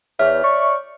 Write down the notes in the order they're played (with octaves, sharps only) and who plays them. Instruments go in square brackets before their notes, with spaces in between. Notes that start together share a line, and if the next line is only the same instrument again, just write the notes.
[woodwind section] E2 [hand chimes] C#5 F6 [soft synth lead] E5
[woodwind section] D5 C#6